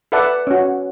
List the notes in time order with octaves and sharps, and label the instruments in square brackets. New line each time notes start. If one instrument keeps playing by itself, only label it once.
[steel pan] A4 B4 D5 E5 F#5 A5
C#4 F#4